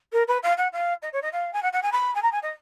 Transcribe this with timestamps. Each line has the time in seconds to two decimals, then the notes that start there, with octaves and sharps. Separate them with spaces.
0.12 A#4
0.27 B4
0.43 F5
0.57 F#5
0.72 F5
1.02 D#5
1.12 C#5
1.22 D#5
1.32 F5
1.53 G#5
1.62 F#5
1.72 F#5
1.82 G#5
1.92 B5
2.15 G#5
2.22 A#5
2.32 G#5
2.42 D#5